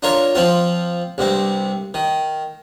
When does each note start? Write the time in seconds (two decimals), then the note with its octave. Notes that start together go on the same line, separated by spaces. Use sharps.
0.03 D4 F4 A#4 C#5
0.35 F3 C4 F4
1.18 C2 G2 C4
1.94 D#3